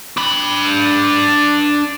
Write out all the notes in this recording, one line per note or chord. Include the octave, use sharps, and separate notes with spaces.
D4 B5